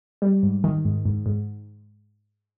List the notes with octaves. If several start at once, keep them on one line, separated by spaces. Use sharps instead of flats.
G3
G#2
D#3
G#2
G#2
G#2